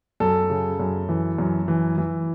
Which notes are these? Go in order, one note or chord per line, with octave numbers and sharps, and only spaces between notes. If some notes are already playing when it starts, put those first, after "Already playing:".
F#2 A4
C#3
F#2
E3
F#2
E3
E3